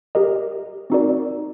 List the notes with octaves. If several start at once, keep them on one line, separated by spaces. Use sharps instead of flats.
G4 A#4 D#5
C4 D#4 F#4 A#4 D5